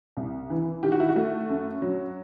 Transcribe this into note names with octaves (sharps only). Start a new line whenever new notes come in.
C2
E3
D#3 G4
F#4
E4
F#4
A3
F#2
F#3